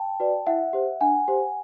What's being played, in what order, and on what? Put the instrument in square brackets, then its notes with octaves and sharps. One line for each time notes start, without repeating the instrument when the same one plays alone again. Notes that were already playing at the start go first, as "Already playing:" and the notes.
Already playing: [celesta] G5 A5
F#4 B4 D5
E4 E5 F#5
G4 C5
D4 F#5 G#5
G4 C5